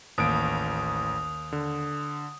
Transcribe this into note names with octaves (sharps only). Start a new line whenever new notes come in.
A1 D#2 D#6 D7
D3